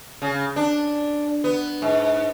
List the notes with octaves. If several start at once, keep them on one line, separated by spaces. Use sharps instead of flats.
C#3
D4
B3
G#2